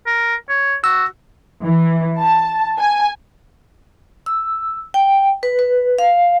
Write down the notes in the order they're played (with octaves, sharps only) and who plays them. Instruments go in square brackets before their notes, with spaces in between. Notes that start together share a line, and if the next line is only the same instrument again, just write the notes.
[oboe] A#4
C#5
[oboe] F#4 [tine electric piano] E6
[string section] E3
A5
G#5
[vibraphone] E6
G5
B4
B4
F5